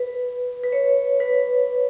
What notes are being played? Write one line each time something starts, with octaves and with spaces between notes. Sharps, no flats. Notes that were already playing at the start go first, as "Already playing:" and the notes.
Already playing: B4
B4
C#5
B4